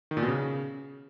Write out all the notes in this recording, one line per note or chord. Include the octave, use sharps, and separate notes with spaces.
D#3
A#2
B2
C#3